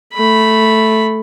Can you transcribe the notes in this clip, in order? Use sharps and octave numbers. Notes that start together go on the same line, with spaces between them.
A3 B5